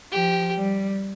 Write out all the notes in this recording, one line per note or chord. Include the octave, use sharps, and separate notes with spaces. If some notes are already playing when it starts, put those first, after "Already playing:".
F3 G4
G3